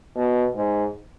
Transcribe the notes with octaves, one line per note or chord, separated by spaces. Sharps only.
B2
G#2